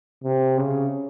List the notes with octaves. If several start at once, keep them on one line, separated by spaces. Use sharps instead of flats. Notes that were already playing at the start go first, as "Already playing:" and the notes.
C3
C#3